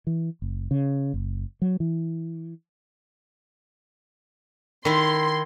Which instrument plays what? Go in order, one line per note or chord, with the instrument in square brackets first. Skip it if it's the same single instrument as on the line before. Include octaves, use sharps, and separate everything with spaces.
[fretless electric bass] E3
F#1
C#3
F#1
F#3
E3
[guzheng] D#3 E4 [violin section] C6